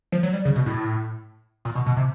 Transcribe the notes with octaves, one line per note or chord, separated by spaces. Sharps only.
F3
F#3
G3
C#3
B2
A2
A#2
B2
B2
C3